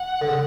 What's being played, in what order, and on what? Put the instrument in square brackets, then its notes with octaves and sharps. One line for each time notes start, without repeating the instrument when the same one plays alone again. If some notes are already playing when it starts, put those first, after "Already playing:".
Already playing: [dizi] F#5
[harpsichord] D3
C#3